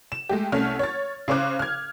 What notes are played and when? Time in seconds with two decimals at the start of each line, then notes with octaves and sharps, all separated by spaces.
0.12 E7
0.29 G#3 A3 G4
0.52 C2 A3 C#4 F6
0.79 C#5 A6
1.28 C#3 C#4 C5 D6 F#6
1.59 F6 G#6